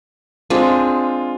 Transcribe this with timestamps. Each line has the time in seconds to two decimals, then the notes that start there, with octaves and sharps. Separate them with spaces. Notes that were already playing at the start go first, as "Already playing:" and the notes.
0.50 G#3 C4 D4 F4